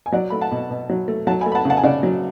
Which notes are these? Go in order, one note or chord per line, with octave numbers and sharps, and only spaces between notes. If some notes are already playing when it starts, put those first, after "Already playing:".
G#5
F#3 D5 F#5
A3 B5
F#5 A5
B2
B2
F#3
A3
F#3 F#5 A5
G#5 B5
A3
B5
F#5 A5
C#3 F#5 A5
G#5
C#3 D5 F#5
F#3